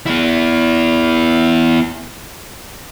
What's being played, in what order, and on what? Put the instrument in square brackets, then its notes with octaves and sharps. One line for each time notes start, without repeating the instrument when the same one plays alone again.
[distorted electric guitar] B3 E4